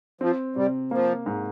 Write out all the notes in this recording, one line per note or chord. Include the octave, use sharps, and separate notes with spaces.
F3 C4
C3 G3
F3 A#3
G#2